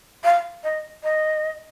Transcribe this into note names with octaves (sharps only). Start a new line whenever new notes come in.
F5
D#5
D#5